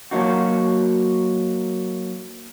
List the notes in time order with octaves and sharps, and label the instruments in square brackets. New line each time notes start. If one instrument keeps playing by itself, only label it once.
[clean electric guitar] F#3 A#3 D#4 F#4